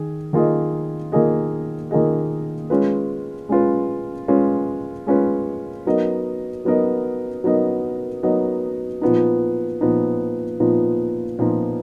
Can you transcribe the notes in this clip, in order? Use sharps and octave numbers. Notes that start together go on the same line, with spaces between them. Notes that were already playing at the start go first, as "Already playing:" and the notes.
Already playing: D#3 G#4
D#3 A#3 F4 G#4 D#5
D#3 A#3 F4 G#4 D#5
D#3 A#3 F4 G#4 D#5
G#3 C#4 F4 B4
G#3 C#4 F4 B4
G#3 C#4 F4 B4
G#3 C#4 F4 B4
F#3 B3 D#4 A#4 D#5
F#3 B3 D#4 A#4 D#5
F#3 B3 D#4 A#4 D#5
F#3 B3 D#4 A#4 D#5
A#2 F3 B3 D#4
A#2 F3 B3 D#4
A#2 F3 B3 D#4
A#2 F3 B3 D#4